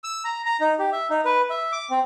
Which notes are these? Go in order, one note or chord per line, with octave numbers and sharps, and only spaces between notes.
E6
A#5
A#5
D#4
G4
E5
D#4
B4
E5
D6
C4